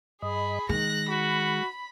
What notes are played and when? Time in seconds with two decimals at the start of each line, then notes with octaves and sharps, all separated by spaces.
0.22 G2 G#4 D#5 B5
0.69 D#3 G#3 F#6 A#6
1.09 F#4 B5